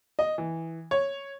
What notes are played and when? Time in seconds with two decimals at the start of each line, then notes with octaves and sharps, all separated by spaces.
0.19 D#5
0.38 E3
0.91 C#5